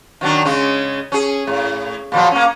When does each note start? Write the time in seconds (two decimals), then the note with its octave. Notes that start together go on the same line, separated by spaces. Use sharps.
0.21 D#3 F#3 D4
0.45 C#3 G#3 C#4
1.12 C#4 G#4
1.47 A2
2.12 A#2 F3 F#3
2.31 A#3 C#4